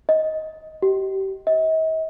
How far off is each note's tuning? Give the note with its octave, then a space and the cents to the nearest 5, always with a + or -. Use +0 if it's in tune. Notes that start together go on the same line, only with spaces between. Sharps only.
D#5 +15
G4 -25
D#5 +45